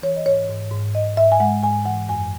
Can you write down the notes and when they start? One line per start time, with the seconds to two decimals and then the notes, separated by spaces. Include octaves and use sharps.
0.02 E3 C#5
0.16 D#5
0.26 G#2 C#5
0.49 G#2
0.71 G#2
0.94 G#2 D#5
1.17 G#2 E5
1.32 G#5
1.40 G#3 F#5
1.63 G#2 G#5
1.85 E3 F#5
2.09 F#2 G#5